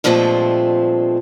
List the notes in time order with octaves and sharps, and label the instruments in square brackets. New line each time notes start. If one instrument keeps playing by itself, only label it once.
[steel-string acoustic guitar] G2 A#2 F3 G#3 A3 C4